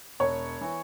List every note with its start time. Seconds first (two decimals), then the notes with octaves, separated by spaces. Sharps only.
0.20 E1 C#5
0.61 E3